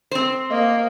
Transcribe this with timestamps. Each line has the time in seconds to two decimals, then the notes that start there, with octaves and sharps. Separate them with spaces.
0.11 C4 C5
0.51 A#3 D#5